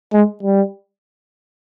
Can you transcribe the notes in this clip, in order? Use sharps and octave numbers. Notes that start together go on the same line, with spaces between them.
G#3
G3